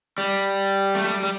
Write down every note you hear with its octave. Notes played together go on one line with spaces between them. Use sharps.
G3
A3
G3
G3